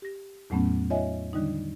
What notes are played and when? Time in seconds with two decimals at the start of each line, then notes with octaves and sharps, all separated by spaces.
0.02 G4 A#6
0.50 E2 A2 F#3 A3 B3 C#4
0.90 D#4 F4 C#5 D#5 E5 G#5
1.33 D3 D#3 G3 D4 D#4